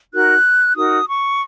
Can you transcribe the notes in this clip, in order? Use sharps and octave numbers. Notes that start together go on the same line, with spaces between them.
D#4 F#4 A#4 F#6
D#4 F#4 A#4 D#6
C#6